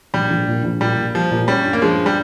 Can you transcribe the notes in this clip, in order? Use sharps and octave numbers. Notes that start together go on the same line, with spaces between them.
A#1 G3
A#1
A#2
A#1
A#2 G3
A#2
F3 G3
A#2
G3 C#4
G2
A#3
G2 F3 G#3
G3